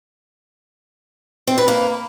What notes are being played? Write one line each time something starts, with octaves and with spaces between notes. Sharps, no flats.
C4
B4
A#3